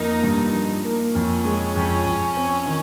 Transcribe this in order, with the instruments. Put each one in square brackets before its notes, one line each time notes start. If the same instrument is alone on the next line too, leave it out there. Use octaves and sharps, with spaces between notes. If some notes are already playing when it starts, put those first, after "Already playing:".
Already playing: [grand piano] F2 A#3 [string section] D#4
[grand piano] G2
F3
A#3
[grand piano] F2 [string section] C#4
[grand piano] G#3
F2
F2
C4
D#3